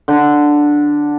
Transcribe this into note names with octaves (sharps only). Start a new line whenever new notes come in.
D3